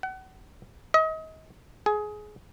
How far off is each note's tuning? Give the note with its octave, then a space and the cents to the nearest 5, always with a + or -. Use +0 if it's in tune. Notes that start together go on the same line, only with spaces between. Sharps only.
F#5 +35
D#5 +35
G#4 +20